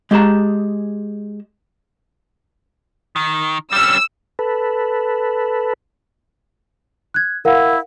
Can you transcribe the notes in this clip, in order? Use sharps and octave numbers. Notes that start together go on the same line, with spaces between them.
G#3 G4 G#4 A5 A#5
D#3
G3 C#4 E6
A4 B4
F#6 G#6
E4 A#4 F5 F#5